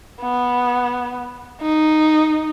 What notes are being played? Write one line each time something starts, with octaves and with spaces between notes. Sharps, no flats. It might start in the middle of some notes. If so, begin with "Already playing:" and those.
B3
D#4